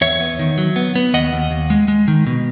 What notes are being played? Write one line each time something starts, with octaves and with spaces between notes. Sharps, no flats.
E2 C#5 E5
B3
D#3
F#3
B3
B3
D#2 D#5 F#5
D#2
D#2
G#3
G#3
D#3
B2